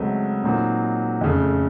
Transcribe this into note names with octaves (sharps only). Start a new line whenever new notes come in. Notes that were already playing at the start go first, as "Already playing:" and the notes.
Already playing: C#2 C3 F#3 A3 C4
A#2 F#3 C4 D#4
F2 C#3 A3